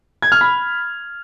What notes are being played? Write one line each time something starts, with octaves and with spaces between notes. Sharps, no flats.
G#6
F6
B5